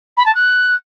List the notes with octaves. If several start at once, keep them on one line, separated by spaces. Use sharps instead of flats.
B5
A5
F#6